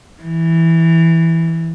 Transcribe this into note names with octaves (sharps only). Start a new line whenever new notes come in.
E3